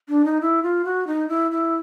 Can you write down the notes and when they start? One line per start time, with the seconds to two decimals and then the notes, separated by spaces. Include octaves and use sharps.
0.09 D4
0.25 D#4
0.41 E4
0.63 F4
0.85 F#4
1.07 D#4
1.29 E4
1.51 E4